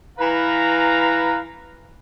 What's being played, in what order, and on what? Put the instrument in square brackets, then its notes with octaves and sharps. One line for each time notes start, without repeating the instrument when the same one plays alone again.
[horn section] E3 B4 F5 A#5